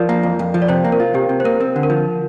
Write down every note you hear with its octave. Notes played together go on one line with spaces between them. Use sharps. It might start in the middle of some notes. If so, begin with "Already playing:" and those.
Already playing: F3 A#4 D5
A#3
F2
F2
F3
D5
C3 C5
A#3
A#4
F4
C3 G4
C3
C5
A#3 A#4
C4
D3
A#4
F3